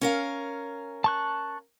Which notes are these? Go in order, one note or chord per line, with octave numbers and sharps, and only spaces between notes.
C#4 A#4 F5
A5 C#6 F#6